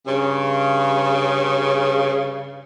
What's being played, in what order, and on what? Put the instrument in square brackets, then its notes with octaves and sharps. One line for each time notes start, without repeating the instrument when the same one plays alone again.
[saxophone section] G2 C#3